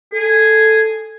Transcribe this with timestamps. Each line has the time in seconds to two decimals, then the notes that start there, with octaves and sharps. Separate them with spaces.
0.14 G#4 A4